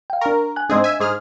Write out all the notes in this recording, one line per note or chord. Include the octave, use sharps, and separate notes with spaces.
F5 G5
D4 A#4 C#6
G#5 F#6
G#2 C4 D4 G#4 D#5 C6
E5 G#5
G#2 G#4 F6